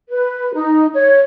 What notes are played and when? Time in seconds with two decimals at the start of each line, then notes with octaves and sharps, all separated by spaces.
0.09 B4
0.54 D#4
0.93 C#5